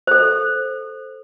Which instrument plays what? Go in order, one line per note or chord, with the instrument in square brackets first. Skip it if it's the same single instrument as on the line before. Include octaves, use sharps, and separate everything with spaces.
[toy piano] A4 C5